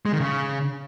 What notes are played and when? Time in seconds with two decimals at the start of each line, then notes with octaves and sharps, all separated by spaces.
0.06 G#3
0.13 D#3
0.20 C#3